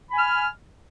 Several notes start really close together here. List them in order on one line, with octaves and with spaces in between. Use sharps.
B5 G#5 F6